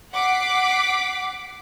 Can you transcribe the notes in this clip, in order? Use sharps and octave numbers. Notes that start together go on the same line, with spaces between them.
F#5 D6 B6 C7